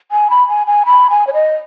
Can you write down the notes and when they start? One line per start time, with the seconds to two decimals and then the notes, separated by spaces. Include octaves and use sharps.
0.12 G#5
0.30 B5
0.49 G#5
0.67 G#5
0.86 B5
1.10 G#5
1.27 C#5
1.34 D#5